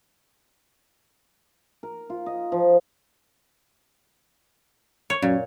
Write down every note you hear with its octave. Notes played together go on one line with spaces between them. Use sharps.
A#4
F4
D#5
F3
C#5
F#2 A#2